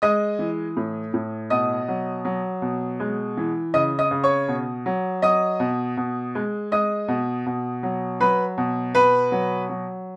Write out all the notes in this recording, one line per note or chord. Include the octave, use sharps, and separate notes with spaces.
G#3 D#5 D#6
E3
A2
A2
B2 D#5 D#6
F#3
F#3
B2
G#3
E3
C#3 D#5 D#6
D#5 D#6
C#3
C#5 C#6
B2
F#3
F#3 D#5 D#6
B2
B2
G#3
G#3 D#5 D#6
B2
B2
F#3
F#3 B4 B5
B2
B2 B4 B5
F#3
F#3